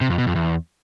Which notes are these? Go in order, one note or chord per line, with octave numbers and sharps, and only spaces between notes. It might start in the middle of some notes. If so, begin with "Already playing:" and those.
C3
F2
B2
F2
E2